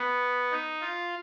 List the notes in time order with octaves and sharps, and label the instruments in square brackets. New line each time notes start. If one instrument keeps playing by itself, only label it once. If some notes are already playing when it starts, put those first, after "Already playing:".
Already playing: [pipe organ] B3
D#4
F4